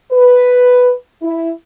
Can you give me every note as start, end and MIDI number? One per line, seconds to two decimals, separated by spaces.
0.12 0.92 71
1.22 1.50 64